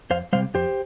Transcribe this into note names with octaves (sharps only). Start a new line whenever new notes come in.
F2 C5 F5
C3 G3 C5 F5
F2 G4 C5